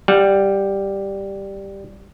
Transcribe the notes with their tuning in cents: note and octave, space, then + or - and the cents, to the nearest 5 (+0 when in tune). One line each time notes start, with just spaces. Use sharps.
G3 +0 F#5 -15